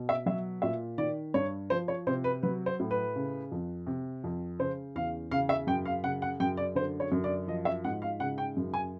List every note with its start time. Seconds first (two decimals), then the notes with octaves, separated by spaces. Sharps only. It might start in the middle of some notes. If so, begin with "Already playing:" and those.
Already playing: B2
0.09 E5
0.26 F#3 E5
0.62 A#2 E5
0.98 D#3 D5
1.34 G2 C#5
1.70 F3 C5
1.88 C#5
2.07 C3 C5
2.24 B4
2.43 F#3 B4
2.66 C5
2.79 A2
2.91 B4
3.16 C#3
3.52 F2
3.87 C3
4.24 F2
4.59 C#3 C5
4.95 E2 F5
5.31 C#3 F5
5.49 E5
5.67 F#2 G5
5.85 F5
6.04 C#3 F#5
6.22 F#5
6.40 F#2 G5
6.57 D5
6.75 D3 C5
7.00 C#5
7.12 F#2
7.24 D5
7.48 F3 D#5
7.65 E5
7.84 G#2 F#5
8.02 F5
8.20 C#3 F#5
8.38 G5
8.57 F#2
8.74 G#5